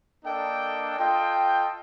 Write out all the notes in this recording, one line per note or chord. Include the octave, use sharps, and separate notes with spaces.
A#3 D4 A4 D#5 G5
F4 A4 D#5 G5